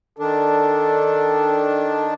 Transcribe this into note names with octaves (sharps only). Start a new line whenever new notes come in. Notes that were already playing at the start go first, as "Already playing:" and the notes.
D#3 D4 A4